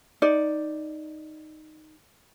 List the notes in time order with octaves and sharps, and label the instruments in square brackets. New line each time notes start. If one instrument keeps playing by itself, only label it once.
[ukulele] D#4 D5